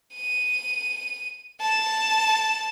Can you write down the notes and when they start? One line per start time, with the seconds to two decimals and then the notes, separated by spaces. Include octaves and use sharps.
0.15 D#7
1.61 A5